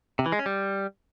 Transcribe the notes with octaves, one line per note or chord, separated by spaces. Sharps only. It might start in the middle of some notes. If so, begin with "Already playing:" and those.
C3
E3
G#3
C#4
G3